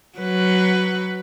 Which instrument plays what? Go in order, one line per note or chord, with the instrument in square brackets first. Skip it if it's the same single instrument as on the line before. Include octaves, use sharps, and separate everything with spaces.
[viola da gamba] F#3 B4